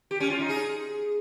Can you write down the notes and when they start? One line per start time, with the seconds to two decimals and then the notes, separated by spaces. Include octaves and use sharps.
0.11 G4
0.20 C#4
0.30 F4
0.40 D#4
0.49 G#4